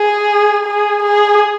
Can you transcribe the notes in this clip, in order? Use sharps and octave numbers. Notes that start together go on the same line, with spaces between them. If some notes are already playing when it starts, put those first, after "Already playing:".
Already playing: G#4
G#4
G#4